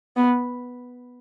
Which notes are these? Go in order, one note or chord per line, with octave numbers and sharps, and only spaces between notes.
B3